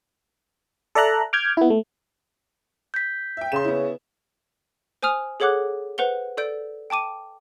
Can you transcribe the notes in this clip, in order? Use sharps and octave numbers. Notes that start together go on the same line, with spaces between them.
A4 D5 E5 A#5 F#6
D6 F6 G6 G#6
B3 E4
A3
G6 B6
E5 G5
C#3 C6 E7
B3 E4
C5 G#5 D#6 F6 F7
G#4 A4 C#5 F#5 D6 F#6
B4 C5 F#5 F7 G7
A4 D5 G6 D7
G5 A5 D6 D#7